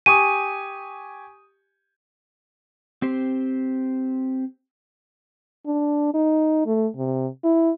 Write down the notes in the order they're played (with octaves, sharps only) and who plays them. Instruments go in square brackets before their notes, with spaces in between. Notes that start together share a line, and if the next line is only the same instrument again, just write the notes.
[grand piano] G4 G#5 C#6 [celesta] D#6 D#7
[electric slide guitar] C4 G4 C5
[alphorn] D4
D#4
A3
C3
E4